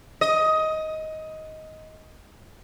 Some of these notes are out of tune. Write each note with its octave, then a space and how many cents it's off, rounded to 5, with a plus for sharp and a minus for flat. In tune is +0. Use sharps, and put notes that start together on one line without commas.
D#5 +15